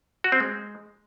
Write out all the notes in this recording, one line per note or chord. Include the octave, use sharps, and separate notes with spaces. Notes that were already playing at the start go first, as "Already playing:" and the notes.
F#4
C4
G#3